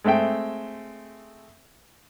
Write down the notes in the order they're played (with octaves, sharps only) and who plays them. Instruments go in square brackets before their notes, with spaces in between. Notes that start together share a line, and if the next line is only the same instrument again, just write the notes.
[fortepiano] G#3 A3 C4 E5 G5